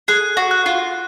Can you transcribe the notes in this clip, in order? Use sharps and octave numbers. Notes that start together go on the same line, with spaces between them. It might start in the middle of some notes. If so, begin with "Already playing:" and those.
G#4 F#6
F#4
F#6
F4